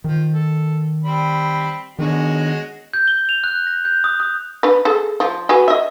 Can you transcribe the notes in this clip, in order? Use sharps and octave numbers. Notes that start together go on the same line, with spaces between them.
D#3 F3
A4
G3 C4 B5
D#3 G#3 B3 C#4 D4 F#4
G6
G7
F7
F#6
A#6
G6
D#6
D#6
D4 B4
G#4 A4
F3
F#4 G#4 B4
D#5 E5